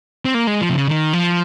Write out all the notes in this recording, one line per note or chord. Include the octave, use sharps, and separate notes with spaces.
C4
A#3
G#3
F3
C3
C#3
D#3
F3